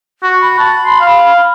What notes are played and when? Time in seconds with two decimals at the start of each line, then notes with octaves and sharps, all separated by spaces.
0.23 F#4
0.42 B5
0.59 A5
0.85 C6
1.00 F5